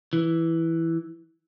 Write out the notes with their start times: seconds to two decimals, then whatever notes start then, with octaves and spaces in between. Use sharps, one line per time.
0.13 E3